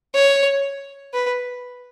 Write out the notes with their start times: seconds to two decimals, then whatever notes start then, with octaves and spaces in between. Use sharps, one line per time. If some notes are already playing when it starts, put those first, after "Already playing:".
0.14 C#5
1.13 B4